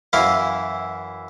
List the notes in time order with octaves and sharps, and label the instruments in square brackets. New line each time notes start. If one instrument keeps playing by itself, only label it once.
[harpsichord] F#2 E3 E4 F5